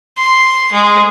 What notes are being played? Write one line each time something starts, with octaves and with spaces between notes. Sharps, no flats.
C6
G#3